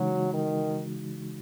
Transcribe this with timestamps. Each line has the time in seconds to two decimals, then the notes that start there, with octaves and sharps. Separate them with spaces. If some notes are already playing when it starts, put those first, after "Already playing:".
Already playing: C#3 E3 F#3 G#3 D#4 F#4
0.33 D#3